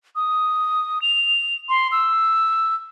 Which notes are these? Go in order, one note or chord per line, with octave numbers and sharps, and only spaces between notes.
D#6
F7
C6
E6